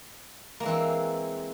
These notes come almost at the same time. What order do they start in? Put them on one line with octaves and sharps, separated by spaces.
A#3 G#3 E3 C4